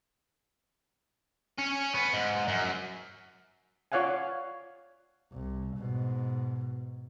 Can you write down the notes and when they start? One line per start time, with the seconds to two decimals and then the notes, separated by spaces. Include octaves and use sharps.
1.58 C#4
1.94 B3
2.13 G#2
2.48 F#2
3.92 F4 C#5 D5 F5 F#5 G#5
5.32 C2
5.77 G#2 B2